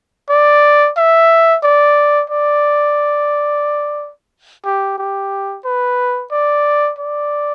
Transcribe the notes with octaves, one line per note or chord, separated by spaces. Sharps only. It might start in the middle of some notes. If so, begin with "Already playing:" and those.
D5
E5
D5
D5
G4
G4
B4
D5
D5